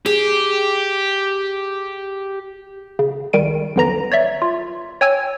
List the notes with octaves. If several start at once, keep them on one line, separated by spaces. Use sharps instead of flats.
G4 G#4
C#3
C2 D#3 G3 D7 D#7
B1 E2 D3 E3 A#5 A#6
C#5 D5 E5
F4
C#5 G5 G#5 E6 G#6